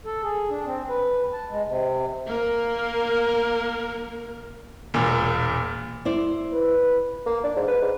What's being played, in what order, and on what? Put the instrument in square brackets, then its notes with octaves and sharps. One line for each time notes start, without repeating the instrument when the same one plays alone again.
[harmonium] A4
G#4
D4
C4
B4
A5
G#3
C3
[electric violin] A#3 A#4
[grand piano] E1 A#2
[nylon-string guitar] E4 C5 D5
[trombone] B4
[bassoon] A#3
D4
G#2
B4
G#2